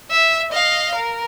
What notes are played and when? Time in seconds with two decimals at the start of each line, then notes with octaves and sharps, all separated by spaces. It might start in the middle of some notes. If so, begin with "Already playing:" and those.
0.11 E5
0.52 D#5 F5
0.95 A#4